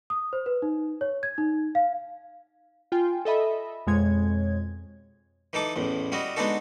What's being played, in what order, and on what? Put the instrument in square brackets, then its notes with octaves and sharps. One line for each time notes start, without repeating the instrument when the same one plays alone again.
[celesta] D#6
C5
B4
D#4
C#5
G#6
D#4
F5
[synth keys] F4 G5 G#5
A4 D#5 E5 B5
F2 B2 G#3 C#5 G#6
[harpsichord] E3 D#4 A4 D6
A1 E2 A2
G3 E4 F#4 D#5
G#3 B3 D4 D#4 F#4 A4